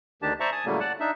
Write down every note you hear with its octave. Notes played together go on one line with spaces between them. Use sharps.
D2 D#3 D4 G4 A5
C5 D5 E5 A5 A#5 C#6
G#5 A5 D#6
A2 C#3 F#3 G3 A3 A#3
D5 F#5 A5
D4 D#4 E5